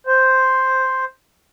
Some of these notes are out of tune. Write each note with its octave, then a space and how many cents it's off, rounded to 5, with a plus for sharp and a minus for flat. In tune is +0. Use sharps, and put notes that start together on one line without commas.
C5 +0